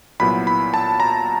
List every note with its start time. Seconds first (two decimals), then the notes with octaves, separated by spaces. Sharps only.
0.20 C2 A#2 F#3 B3 E4 B5
0.47 B5
0.74 A5
1.00 A#5